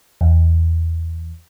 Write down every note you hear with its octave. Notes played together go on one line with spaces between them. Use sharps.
E2